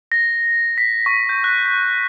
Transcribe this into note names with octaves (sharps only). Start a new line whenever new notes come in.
A#6
B6
C#6
G6
F#6
B6